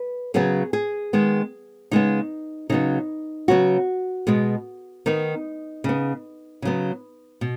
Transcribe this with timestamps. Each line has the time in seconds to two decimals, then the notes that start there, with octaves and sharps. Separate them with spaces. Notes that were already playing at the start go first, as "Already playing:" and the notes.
Already playing: B4
0.34 C#3 F#3 B3 G#4
0.73 G#4
1.13 D#3 G#3 B3
1.91 C#3 G#3 B3 D#4
2.70 C#3 F#3 B3 D#4
3.48 C#3 F#3 B3 F#4
4.27 B2 G#3 B3
5.06 D#3 B3 D#4
5.84 C#3 B3
6.62 C#3 F#3 B3
7.41 B2